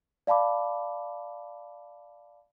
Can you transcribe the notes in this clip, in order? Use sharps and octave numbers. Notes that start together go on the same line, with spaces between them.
D5 F5 A5 B5 D6